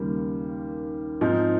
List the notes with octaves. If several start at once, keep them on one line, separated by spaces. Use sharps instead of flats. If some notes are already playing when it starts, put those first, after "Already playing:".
Already playing: D#2 C#3 G3 A#3
G#2 F3 C4 D#4